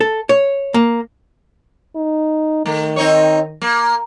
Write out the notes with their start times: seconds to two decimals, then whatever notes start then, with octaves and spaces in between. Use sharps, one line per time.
0.01 A4
0.29 C#5
0.74 A#3
1.95 D#4
2.66 D#3 A3
2.96 C4 D#4 C#5
3.62 A#3